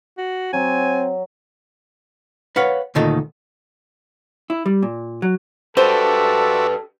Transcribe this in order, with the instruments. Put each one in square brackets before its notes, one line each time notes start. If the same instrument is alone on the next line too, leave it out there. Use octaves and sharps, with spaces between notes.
[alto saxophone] F#4
[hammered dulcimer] F#3 [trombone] C4 [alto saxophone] G#5
[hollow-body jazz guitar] B4 C#5 F5 F#5
D2 A#2 D#3 A4 D#5
E4
G3
A#2
F#3
[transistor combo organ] F#4 D5 E5 [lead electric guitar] G4 B4 [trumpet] A4 [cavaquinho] C5